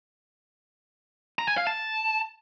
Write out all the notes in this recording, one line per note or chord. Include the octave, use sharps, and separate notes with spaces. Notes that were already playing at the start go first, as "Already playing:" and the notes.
A#5
G#5
F5
A5